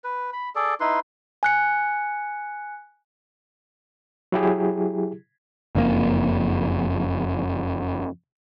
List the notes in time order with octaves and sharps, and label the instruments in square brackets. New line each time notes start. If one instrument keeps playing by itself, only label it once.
[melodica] B4
B5
G#4 A4 D5
D#4 E4 B4 C6
[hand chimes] G#5 F#6 C#7
[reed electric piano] F#3 E4 G4 G#4
[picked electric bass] F#1 F2 A2 A#3